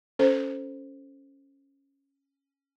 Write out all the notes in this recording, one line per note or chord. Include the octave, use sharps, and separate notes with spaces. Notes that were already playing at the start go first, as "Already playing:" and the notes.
C#4 A4 C5